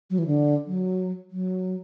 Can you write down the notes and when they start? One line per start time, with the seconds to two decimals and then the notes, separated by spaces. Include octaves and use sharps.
0.10 F#3
0.18 E3
0.27 D3
0.67 F#3
1.31 F#3